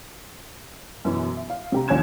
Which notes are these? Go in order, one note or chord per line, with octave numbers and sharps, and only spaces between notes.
F#2 B2 E3 F#3
E5
F5
C3 G4 A#5
A#1 D#2 C#4 G#5 G#6 E7